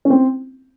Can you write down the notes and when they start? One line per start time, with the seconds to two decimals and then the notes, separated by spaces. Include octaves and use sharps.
0.05 C#4
0.10 C4